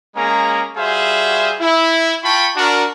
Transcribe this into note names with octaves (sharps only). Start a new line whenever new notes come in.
G#3 A#3 C#4 G#4 A#5
G3 F#4 G#4 C5 E5 F5
E4
F4 G5 A5 B5 C#6
D4 F#4 A#4